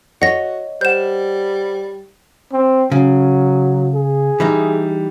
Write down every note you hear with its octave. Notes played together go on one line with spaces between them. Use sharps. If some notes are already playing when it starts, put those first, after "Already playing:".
F#4 C#5 D#5 F#5 A#6
G3 C5 F#5 G6 E7
C4
C#3 F#3
G#4
E3 G3 D#4